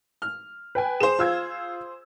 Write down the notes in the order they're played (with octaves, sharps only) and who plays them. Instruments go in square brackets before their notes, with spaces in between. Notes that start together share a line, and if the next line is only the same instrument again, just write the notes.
[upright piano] F6
[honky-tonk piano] B4 G5 G#5
[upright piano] G#4 C5 [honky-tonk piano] E7
[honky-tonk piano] F4 E6 G#6